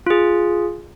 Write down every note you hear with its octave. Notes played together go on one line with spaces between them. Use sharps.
F4 G#4